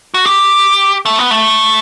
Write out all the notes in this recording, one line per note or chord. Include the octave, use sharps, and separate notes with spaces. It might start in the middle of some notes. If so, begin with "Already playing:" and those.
F#4
G4
A3
B3
A3